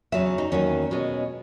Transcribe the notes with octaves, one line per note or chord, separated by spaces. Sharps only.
E2 C#3 F#3 C#4 E5
D#4
E2 D#3 F#3 A#3 C#4
B2 G#3 C#4